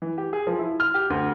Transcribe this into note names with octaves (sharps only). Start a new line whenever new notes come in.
E3
G4
G#4
F3
E4
F6
G4
D2